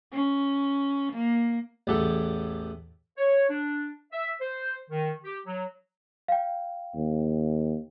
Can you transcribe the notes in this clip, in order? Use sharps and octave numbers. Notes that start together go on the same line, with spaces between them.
C#4
A#3
A1 E2 E3 G4 A4 F#5
C#5
D4
E5
C5
D#3
G4
F#3
F5 G5
D#2